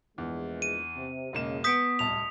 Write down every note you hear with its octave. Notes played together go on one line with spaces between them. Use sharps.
A#1 E2 E3 G#3
D#7
C3
E1 C#3 A#3 D#4 E7
B3 D#6 G6 B6 C#7 D7
D1 C2 A5 F7